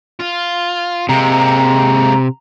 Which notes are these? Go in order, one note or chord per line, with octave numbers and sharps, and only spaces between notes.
F4
C3 G#3 A#3 A#5